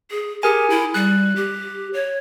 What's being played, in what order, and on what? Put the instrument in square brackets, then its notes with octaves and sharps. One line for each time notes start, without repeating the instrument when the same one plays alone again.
[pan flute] G#4
[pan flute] G4 [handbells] G#4 A#4 G#5
[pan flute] E4
[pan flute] G3 [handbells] F#6
[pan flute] G4
C#5